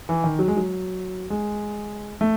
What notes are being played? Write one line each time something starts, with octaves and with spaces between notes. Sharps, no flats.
E3
D#3
F#3
G#3
F#3
G#3
A3